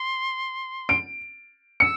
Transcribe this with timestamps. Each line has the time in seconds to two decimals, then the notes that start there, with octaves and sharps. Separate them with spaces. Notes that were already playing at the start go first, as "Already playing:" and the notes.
Already playing: C6
0.89 D7
1.80 E6 C#7